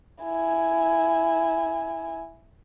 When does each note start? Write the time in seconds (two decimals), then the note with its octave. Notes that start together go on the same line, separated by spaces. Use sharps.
0.23 E4 G#5